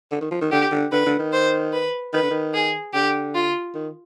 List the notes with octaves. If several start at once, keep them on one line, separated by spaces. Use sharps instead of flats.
D3
D#3
F3
D#3
D3 G4
D3
D3 B4
D3
D#3
C5
B4
D#3 B4
D3
D#3
G#4
D3 G4
F4
D#3